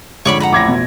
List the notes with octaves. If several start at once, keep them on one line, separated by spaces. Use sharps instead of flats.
F2 G#2 D3 C#5 D5 B5
F#5 A#5 B5
A1 F2 D6 G#6 A#6
B2